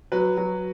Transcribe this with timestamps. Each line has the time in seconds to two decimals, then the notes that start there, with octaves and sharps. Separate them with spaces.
0.12 F#3 B4
0.37 F#3